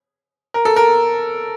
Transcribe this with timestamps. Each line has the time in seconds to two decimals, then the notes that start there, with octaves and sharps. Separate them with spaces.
0.54 A#4
0.65 A4
0.76 A#4